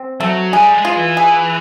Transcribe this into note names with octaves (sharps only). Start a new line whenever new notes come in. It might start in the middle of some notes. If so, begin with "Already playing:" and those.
Already playing: C4
F#3 A3
G3 G#4
G#3
F4
E3
G#4